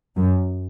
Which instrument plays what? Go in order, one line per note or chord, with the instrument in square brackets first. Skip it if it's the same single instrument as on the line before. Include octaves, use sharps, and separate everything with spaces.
[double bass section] F#2